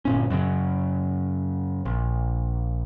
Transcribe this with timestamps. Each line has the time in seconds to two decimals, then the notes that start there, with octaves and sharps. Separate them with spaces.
0.05 G1 A#2 C#4
0.30 F#2 C#3
1.85 A#1